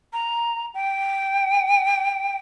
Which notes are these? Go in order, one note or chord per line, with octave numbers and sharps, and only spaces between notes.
A#5
G5